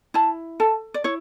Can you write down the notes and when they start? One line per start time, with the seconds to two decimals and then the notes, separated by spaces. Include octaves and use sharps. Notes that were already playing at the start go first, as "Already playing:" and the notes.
0.14 E4 A5
0.60 A4 A5
0.94 D5
1.04 E4 C#5